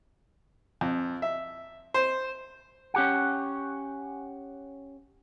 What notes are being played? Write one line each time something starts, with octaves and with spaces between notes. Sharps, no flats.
F2
E5
C5
C#4 G4 F#5